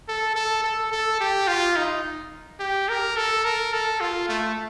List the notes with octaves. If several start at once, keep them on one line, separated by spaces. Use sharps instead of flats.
A4
A4
A4
A4
G4
F4
D#4
G4
A#4
A4
A#4
A4
F4
A3